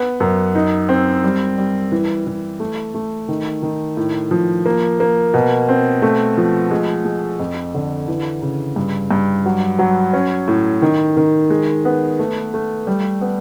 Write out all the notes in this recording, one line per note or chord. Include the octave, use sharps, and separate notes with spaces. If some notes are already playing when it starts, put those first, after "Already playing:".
Already playing: B3
F#2
D#4
C4
G3
G3
E3
E3
A3
A3
D#3
D#3
A2
F3
A#3
A#3
B2
C4
A3
F3
G#3
G#3
F2
D3
E3
C#3
G2
G2
F#3
F#3
C#4
A2
D#3
D#3
G#3
B3
A3
A3
G3
B3